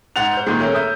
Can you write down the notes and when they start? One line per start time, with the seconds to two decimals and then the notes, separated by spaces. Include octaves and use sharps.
0.16 G#2 F#5 A6 F7
0.33 C5 G6
0.47 A#2 D#3 G#3
0.60 A3 C#4 A#4
0.73 E5 D#6 G6